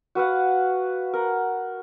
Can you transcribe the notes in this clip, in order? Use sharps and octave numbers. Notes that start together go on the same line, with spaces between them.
F#4 B4 F5 F#5
A#4 F#5